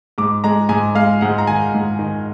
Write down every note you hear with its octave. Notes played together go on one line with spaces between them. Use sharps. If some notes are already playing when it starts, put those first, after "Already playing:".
G#2 D6
G#3 A#5
G#2 G#5
G#3 F5
G#2 F#5
A#5
D#3 G#5
G#2
D#3